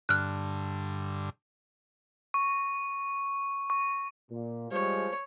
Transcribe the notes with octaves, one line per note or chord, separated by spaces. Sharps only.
G2 D3 F6 F#6
C#6
C#6
A#2
F3 G3 G#3 C#5